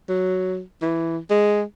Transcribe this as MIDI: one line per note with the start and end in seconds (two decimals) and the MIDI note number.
0.09 0.61 54
0.82 1.18 52
1.30 1.63 56